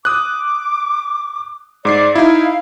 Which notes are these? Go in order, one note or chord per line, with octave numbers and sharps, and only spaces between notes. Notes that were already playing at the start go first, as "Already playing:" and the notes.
D6 D#6 F#6
G#2 D5 D6 C7
D#4 E4 F5